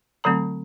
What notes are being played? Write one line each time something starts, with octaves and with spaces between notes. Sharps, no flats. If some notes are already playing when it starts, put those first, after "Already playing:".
D3 F#3 A3 C4 A#5